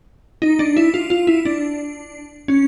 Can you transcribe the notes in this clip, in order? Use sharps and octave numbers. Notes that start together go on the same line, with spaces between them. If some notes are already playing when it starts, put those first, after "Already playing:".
D#4
D4
E4
F4
F4
E4
D4
C#4